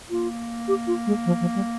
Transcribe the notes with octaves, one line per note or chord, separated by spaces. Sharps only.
A#3 F4
G4
F4
G#3
F3
F3
G3